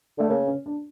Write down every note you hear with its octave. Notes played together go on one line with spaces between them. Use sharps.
D3 A3
C#3 A#3
C#4
D4